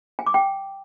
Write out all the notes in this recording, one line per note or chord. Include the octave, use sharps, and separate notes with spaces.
G#5
D6
G5